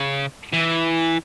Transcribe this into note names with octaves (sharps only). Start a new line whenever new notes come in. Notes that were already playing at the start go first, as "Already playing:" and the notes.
Already playing: C#3
E3